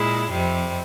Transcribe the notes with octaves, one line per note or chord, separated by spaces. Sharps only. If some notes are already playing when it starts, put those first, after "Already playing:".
Already playing: A#2 G#3 E4
F2 C3 G3